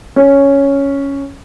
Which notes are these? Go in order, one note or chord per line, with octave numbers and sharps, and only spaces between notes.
C#4